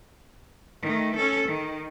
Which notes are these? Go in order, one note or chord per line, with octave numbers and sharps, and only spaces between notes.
D#3 A3
C#4 A4
D#3